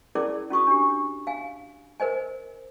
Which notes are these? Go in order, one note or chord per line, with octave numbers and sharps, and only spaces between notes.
C#4 E4 G#4 A#4 D5 D6
C#4 F#4 C#6 D#6
D4 G4
F5 G#5
A#4 C5 D#5 G#5